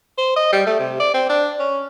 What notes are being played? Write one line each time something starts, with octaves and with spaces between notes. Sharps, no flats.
C5
D#5
G3
A3
C3
D5
C4
D4
C#4